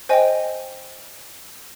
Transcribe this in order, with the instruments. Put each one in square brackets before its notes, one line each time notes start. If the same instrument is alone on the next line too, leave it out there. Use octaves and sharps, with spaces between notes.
[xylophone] C5 D#5 G5 G#5